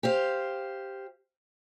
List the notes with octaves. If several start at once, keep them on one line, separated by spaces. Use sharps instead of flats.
G4 C5 F5